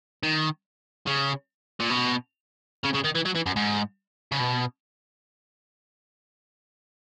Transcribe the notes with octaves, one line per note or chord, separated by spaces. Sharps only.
D#3
C#3
A#2
B2
C#3
C#3
D#3
E3
F#3
E3
F#2
G#2
C#3
B2